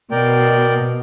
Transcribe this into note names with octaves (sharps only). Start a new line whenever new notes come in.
B2 A#4 D5 G5